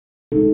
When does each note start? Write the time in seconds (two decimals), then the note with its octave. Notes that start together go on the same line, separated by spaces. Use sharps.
0.32 G#3 D#4 A4